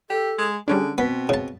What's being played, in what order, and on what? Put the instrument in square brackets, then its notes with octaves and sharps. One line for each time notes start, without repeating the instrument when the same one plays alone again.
[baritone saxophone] G4 [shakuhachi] A4
[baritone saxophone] G#3
[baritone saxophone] D3 [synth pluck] G3 C#4 D4 [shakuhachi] G#4
[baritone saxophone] B2 [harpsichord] B3 [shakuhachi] C4 [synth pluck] B6
[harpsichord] C#3 A5